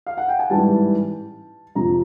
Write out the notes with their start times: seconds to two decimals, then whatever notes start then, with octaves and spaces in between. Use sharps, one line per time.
0.07 F5
0.18 F#5
0.28 G5
0.39 G#5
0.50 A1 G#2 E3 G3 A5
1.75 F2 C3 F3 A#5